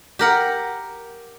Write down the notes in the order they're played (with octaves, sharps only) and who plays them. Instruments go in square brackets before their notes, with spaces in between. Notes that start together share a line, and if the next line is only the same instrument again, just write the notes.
[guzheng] G4 A#4 F#5